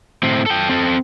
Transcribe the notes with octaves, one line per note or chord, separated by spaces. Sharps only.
A2 C4
A4 G5
C4 A4